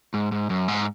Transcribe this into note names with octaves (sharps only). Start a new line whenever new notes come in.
G#2
G#2
F#2
G#2